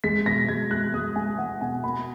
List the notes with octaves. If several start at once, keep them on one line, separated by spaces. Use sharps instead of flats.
G#3 B6
B2 A#6
G#3 G#6
G#3 F#6
G#3 D#6
G#3 G#5
G#3 F#5
B2 G#5
A#3 B5